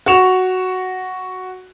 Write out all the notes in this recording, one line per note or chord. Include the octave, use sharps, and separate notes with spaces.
F#4 C#6 E7 F7